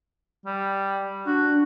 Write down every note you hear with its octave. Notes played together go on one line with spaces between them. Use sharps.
G3
D4 F#4